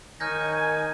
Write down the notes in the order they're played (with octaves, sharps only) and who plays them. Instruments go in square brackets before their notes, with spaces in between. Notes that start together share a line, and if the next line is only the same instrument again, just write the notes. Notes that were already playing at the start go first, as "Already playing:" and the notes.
[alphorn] D#3 [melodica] D#4 C#5 [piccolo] G#5 [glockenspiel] F6 G6 A#6